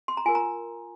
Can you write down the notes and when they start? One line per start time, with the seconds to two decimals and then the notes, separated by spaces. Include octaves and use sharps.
0.08 C6
0.17 A#5
0.26 F4 A#4 G#5
0.35 A#5